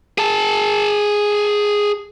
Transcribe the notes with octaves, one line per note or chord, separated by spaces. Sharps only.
G#4 A5